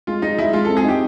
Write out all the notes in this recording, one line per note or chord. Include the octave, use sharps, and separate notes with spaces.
G#3 F4
G#3 D#4
G#3 E4
G#3 F4
C4 A4
G#4
D#4 G4